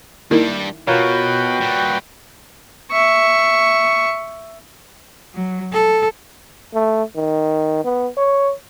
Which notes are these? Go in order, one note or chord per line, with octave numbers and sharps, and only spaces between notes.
D#3 G3 A#3 D4 E4
B2 F4 F#4 A#4 B4 C#5 G5
A#2 G3
E5 C#6
F#3
A4
A3
D#3
B3
C#5